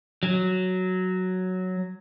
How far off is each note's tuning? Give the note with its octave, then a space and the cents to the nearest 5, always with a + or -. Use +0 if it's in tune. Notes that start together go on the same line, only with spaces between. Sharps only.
F#3 +0